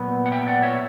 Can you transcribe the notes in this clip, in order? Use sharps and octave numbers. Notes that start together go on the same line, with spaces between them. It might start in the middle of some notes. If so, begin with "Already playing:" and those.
Already playing: A#2 F#3 B3
F#5
E5 G5
D5 F#5
C#5 E5